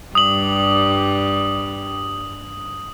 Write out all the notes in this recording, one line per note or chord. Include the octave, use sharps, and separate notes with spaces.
G2 G3 D#6 F#7